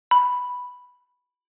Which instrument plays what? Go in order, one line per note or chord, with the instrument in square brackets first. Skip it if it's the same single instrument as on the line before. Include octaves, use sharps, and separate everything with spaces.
[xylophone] B5